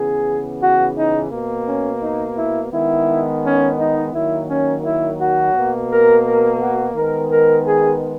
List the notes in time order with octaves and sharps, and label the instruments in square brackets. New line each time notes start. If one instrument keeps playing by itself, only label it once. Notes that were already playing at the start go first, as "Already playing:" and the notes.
Already playing: [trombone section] C#3 E3 B3 G#4
F#4
D#4
B2 A#3
C#4
D#4
E4
D#3 G#3 B3 E4
C#4
D#4
D#3 F#3 A#3 E4
C#4
E4
F#4
B2 A#3
A#4
A#4
F#4
D#3 G#3 B3 A#4
A#4
G#4